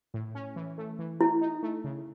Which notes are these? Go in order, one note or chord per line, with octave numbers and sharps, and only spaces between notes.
A2
C#4
E3
A3
E3
A3 E4
D#4
A3
C#3